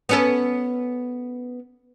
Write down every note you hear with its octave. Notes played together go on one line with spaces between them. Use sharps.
B3 C#4 A4